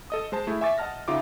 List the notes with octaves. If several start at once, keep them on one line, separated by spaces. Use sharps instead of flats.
A4 D#5 D#6
G#3 C5 A5
A3 E4 G#4
E5 G#5 C#6 D6 A6
D#5 F#5 A5 F6 A#6
C#3 D#4 F4 E5 F#5 D6